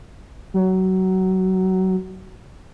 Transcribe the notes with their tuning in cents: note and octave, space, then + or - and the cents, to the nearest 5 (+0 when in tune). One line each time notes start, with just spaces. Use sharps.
F#3 +20